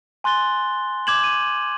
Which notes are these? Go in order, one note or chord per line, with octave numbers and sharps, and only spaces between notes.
G#5 C6 F#6 A6 G7
D6 G6 G#6 E7 F#7
D#7